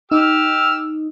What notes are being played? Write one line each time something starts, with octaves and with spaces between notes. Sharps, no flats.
D#4 G4 E6 F6